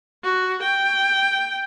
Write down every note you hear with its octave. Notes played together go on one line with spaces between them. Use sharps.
F#4
G5